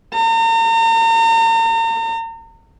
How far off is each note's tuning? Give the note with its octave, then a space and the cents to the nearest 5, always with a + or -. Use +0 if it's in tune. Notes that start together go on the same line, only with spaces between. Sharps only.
A#5 -40